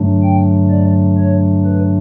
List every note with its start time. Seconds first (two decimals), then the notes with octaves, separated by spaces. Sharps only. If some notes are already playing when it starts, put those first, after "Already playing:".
Already playing: G2 D3 F#3 A3 D4
0.23 G5
0.70 D5
1.17 C#5
1.65 B4